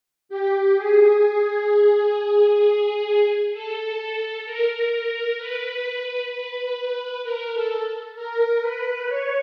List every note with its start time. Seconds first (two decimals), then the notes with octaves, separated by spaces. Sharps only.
0.29 G4
0.75 G#4
3.53 A4
4.45 A#4
4.92 A#4
5.38 B4
6.30 B4
6.77 B4
7.23 A#4
7.53 A4
8.15 A#4
8.61 B4
9.08 C#5